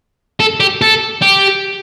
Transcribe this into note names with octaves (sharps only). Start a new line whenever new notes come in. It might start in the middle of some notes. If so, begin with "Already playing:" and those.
A4
G4
A4
G4